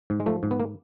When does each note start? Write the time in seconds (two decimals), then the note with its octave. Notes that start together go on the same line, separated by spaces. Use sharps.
0.10 G#2
0.20 G#3
0.26 F3 A3
0.43 G#2
0.51 B3
0.60 A#3